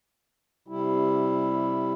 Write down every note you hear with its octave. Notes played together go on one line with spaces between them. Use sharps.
C3 G3 E4